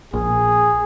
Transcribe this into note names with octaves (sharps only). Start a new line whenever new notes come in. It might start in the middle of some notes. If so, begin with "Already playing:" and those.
A#1 G#4